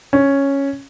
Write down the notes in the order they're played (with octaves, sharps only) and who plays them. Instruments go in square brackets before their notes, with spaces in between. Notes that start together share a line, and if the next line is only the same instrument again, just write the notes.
[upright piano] C#4